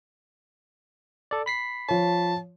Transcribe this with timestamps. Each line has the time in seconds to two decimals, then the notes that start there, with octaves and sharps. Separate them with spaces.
1.31 A4 D5
1.46 B5 B6 C7
1.88 F3 C#5 A5